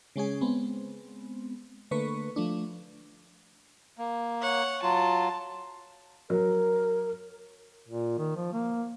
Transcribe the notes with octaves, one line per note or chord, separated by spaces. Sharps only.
C#3 G#3 C#4 G#4
G#3 B3 C4
D3 A3 A#3 B4 C#6
F3 A3 D4
A#3
C#5 F#5
F#3 F4 A5
F#3 A#4
A#2
D#3
F3
A#3